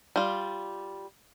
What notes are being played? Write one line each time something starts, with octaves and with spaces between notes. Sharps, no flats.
G3 F4